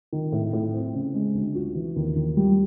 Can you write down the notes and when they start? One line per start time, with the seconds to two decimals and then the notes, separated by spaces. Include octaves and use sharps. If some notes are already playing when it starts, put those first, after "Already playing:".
0.13 D#3
0.32 A2
0.53 A2
0.74 C4
0.94 C#3
1.14 G#3
1.35 D2
1.55 F#4
1.75 E3
1.96 D#2
2.16 D#2
2.37 G3